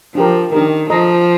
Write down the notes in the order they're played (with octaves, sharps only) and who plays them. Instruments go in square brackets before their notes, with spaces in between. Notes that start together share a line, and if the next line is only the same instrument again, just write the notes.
[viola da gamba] F3 [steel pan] D4 G4 A#4
[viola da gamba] D#3 [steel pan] D4 G4 A#4
[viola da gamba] F3 [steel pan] A4 D#5 A#5